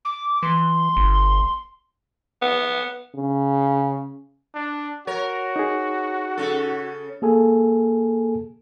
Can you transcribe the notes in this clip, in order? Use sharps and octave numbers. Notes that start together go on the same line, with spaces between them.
D6
E3 C6
G1
B3
C#3
D4
F#4 A#4 C#5
D#4 G#4
C#3 A4
A#3 G#4 A4 G#5